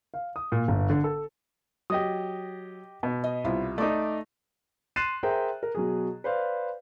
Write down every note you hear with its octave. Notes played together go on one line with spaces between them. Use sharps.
F5
D#6
A#2
G1
D3
A4
F#3 G4 D#5 D#6
B2
D#5
C2 E4 F4
A3 D#4 D5 D6
C6 F#6 A6 C7 D#7 E7
G#4 A#4 C5 E5 G5 A#5
A#4
B2 F#3 G#4
B4 C5 D5 F5